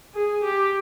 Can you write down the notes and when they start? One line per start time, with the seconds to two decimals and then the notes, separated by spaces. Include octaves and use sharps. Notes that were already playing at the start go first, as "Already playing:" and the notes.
0.15 G#4
0.44 G4